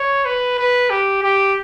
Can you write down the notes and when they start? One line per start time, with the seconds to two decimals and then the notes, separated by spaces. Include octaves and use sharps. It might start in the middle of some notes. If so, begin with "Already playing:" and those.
Already playing: C#5
0.25 B4
0.58 B4
0.90 G4
1.23 G4